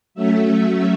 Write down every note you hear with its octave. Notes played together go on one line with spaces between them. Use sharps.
F#3 A3 C#4 E5